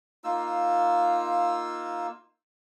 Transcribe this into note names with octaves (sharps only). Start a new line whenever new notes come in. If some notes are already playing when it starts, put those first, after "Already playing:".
A#3 D#4 F4 E6